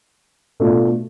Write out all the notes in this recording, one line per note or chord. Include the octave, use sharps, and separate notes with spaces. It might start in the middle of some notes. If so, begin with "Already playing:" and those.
B2 A3 D4 F4